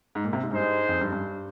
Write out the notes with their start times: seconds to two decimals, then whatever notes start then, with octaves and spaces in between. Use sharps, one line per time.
0.15 G#2
0.24 A#2
0.33 C3
0.43 G#2
0.51 G2 G#3 D#4 G#4 C5
0.89 F2
1.01 G2
1.13 G2